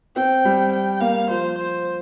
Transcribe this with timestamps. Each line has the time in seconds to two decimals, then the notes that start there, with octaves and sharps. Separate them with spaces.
0.16 C4 G5
0.45 G3
0.73 G5
1.01 A#3 F5
1.30 F3 C5
1.58 C5